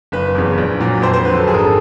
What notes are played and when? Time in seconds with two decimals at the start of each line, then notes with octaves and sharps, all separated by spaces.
0.12 F#1 B4
0.35 E2 C#3
0.58 A#1
0.80 A#2 F#3
1.02 F2 C5
1.13 C5
1.25 D3 F#3 B4
1.36 A4
1.47 G#1 G#4
1.54 A#4
1.59 A4